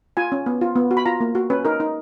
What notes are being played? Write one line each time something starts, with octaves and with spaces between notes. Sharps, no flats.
F4 G#5
C#4
B3
F4
B3
F#4
B5
F4 A#5
A#3
F#4
C#4 B4
D#4 A#4
D#4